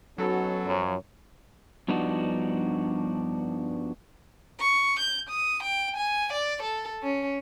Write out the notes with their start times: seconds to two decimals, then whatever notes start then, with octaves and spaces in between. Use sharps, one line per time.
0.18 F#3 B3 C#4 D#4 F#4 A4
0.67 F#2 F3 C#5
1.88 G2 F3 B3 D4 D#4 F#4
4.60 C#6
5.00 G6
5.29 D#6
5.63 G5
5.97 G#5
6.33 D5
6.62 A4
7.03 C#4